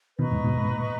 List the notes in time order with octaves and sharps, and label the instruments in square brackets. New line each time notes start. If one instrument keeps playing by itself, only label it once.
[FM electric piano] B2 D#3 [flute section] B4 D#5 A#5 C#6
[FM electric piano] E2 G#2
G#2 B2
G#2
A#2